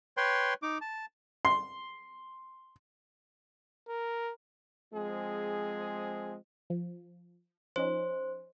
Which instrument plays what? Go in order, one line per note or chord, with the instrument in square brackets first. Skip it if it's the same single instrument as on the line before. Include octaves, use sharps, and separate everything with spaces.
[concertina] B4 C#5 G5 C6
D#4 D6
A5
[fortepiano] C6
[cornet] A#4
[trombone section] F3 G#3 C4 G#4
[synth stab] F3
[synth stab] F3 C#4 D#4 [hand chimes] C5